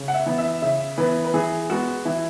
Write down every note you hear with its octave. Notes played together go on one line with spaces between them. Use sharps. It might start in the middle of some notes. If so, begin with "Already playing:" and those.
Already playing: C#3
F#5
E5
E3 B3
E5
C#3 E5
E3 B3 B4
B4
E3 G#4
G#3 B3 F#4
E3 E4